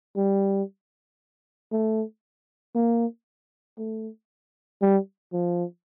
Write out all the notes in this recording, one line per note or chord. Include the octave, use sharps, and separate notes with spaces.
G3
A3
A#3
A3
G3
F3